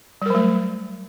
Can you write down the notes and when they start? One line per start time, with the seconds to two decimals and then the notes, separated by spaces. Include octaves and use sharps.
0.22 G3
0.26 A#4
0.30 F#3
0.35 A3